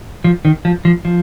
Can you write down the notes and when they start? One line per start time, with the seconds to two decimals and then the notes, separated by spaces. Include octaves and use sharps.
0.24 F3
0.45 D#3
0.65 F3
0.85 F3
1.05 F3